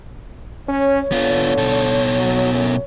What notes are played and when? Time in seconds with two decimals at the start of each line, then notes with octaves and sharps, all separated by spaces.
0.68 C#4 C#5
1.12 D3 B3 F4
1.57 B2 A4
2.17 F#3
2.53 F#2